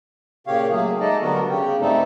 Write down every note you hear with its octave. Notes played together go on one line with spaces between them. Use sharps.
A#2 C#3 G4 C#5 F5
F#3 A3 A#3 G#4
G#3 A3 D#4 A4 D5 D#5
D3 F#3 G3 B3 F#4 A#4
C#3 G4
G2 G3 A3 C4 D#4 A4